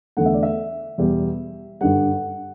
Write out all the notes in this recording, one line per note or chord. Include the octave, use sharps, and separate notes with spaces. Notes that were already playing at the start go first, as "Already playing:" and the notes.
E2 D3 A3 F#5
E5
D5
E5
E2 B2 G3
G2 D3 G3 F#5